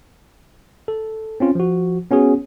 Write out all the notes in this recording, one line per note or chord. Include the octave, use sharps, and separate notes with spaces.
A4
C4 C#4 F4
F3 F#4
B3 C#4 F#4 G#4